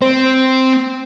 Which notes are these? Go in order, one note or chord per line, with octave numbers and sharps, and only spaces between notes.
C4 C5